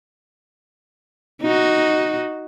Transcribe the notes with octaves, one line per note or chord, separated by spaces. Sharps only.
D#4 F#4